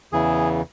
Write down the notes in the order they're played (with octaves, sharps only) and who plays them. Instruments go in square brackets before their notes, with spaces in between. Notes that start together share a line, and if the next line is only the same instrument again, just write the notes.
[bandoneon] E2 C#3 E3 G#4